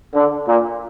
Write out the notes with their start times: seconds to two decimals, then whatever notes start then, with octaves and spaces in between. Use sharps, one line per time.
0.14 D3
0.46 A#2